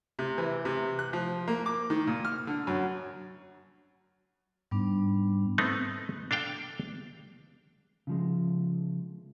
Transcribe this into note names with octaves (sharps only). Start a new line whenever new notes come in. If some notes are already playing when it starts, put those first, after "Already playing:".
C3
E3
C3
F#6
F3
A#3
D6
D#3
A#2
F6
D3
F#2
G#2 G3 B3 D4
A3 B3 C4 D#4
D4 A4 F5 G5
C#3 F3 G#3